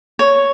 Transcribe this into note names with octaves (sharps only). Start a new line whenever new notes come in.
C#5